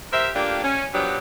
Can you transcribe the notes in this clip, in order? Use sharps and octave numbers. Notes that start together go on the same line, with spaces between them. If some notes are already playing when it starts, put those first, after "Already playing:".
G4 A#4 C5 E5
A3 A#3 D4 F4 G4
C#4
B2 F3 F#3 B3 D4 G4